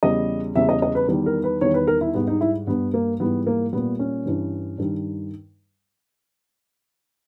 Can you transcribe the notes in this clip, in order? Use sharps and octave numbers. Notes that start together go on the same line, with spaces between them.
E2 C#3 G3 D#5
E2 C#3 G3 E5
D#5
D#5
B4
E2 D#3 G3
A#4
B4
E2 D#3 G3 C#5
B4
A#4
E4
G#2 G3 B3
D#4
E4
G2 G3 B3
A#3
G#2 E3 G3 B3
A#3
A#2 G3 B3
C#4
G2 E3 G3
G2 D#3 G3